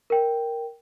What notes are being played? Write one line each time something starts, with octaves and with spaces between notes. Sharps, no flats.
A#4 G5